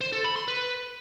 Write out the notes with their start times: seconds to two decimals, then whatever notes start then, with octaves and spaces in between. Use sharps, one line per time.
0.01 C5
0.13 A4
0.24 B5
0.36 C6
0.48 B4